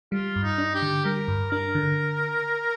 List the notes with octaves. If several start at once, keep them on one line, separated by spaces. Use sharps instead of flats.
G3 F4
G2
D#4
D4
G4
D3
G3 A#4
G2
D4 A#4
D3